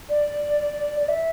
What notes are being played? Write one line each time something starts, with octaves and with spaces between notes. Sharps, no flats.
D5
D5
E5